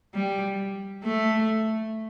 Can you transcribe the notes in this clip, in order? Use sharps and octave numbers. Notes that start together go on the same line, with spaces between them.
G3
A3